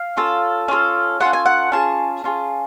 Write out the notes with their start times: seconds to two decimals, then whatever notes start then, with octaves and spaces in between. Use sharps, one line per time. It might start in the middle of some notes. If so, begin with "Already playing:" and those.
Already playing: F5
0.17 C#4 F4 A4
0.68 C#4 F4 A4
1.20 C#4 F4 A4 F#5
1.33 G#5
1.46 F#5
1.72 C#4 F4 G#4 A5
2.24 C#4 F4 G#4